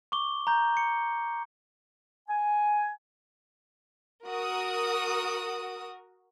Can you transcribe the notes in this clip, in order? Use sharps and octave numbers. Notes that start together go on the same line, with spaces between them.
C#6 D6 G7
A#5 G6
C#7
G#5
F#4 A#4 D#6